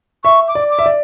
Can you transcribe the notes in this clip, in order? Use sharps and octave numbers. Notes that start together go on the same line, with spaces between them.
E5 C#6
D6
D5
D6
E5
D5